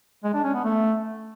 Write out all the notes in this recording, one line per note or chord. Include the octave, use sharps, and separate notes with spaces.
G#3
D4
C#4
B3
A3